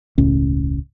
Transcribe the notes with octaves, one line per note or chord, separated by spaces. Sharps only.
E1 C#2 A2 C#4